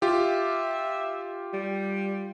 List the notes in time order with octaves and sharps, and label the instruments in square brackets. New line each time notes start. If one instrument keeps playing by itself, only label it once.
[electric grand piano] F4 G4 [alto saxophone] E5
[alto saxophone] G3